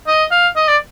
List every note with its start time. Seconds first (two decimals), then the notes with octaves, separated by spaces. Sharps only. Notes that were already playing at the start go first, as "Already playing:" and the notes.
0.07 D#5
0.31 F5
0.56 D#5
0.68 D5